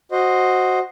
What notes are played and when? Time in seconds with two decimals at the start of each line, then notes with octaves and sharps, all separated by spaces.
0.11 F#4 C5 D#5